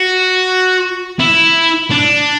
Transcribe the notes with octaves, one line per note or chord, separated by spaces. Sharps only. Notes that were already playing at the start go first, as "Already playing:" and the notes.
Already playing: F#4
E4
D4